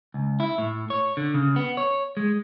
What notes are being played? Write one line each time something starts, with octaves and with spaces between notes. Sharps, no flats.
C#2
E4
A2
C#5
D3
C#3
B3
C#5
G#3